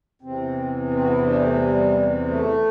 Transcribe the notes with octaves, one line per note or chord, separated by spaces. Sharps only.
E2 C3 E3 C4
C4
F#4
E4
D4
A3
A3
G3
A3